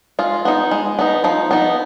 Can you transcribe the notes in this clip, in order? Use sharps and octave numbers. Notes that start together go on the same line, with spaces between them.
G#3 F4
B3 D#4
G#3
B3 D#4
F3 D#4
B3 D#4